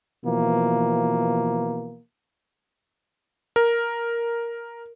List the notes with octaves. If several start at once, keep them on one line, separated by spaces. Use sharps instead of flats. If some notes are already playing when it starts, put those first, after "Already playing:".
B2 E3 F3 A#3
A#4